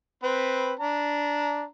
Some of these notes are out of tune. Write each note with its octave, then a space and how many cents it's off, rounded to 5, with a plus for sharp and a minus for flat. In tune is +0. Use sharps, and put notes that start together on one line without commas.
C4 +0 B4 +0
D4 -10 A#5 +0